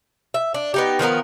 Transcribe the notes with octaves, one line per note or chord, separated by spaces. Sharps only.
E5
D4
B3 D#4 G4
D#3 F3 B3 A#4